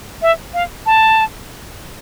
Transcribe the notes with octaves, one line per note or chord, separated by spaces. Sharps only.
E5
F5
A5